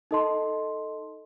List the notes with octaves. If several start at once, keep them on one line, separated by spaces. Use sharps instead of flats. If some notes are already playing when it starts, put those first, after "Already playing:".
D#4 A4 D#5 A5 C6